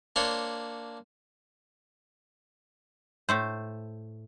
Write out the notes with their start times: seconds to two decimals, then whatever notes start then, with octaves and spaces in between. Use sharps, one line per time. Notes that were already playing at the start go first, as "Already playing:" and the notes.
0.16 A#3 D4 C5 C#5
3.29 A2 A3 C5